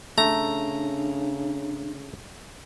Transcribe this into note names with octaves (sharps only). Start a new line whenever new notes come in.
C#3 A3 D4 A#5